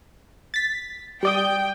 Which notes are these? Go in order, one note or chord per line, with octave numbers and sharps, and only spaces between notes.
A6 B6
G3 D5 G5 D#6